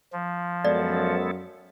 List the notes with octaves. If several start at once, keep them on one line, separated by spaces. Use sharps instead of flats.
F3
F#2 G#3 B3 A4 D5